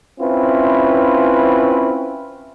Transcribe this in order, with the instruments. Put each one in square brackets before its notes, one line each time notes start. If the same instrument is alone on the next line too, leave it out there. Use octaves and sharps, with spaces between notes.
[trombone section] C4 C#4 E4 F4 B4